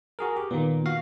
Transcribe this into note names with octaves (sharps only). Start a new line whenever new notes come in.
F#4 G#4 A#4
G4
A#2 D#3 A#3 B3
F#4 F5